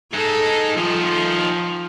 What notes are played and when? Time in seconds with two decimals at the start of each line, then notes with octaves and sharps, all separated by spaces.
0.13 G#3 D#4 A4
0.78 D#3 F3 F4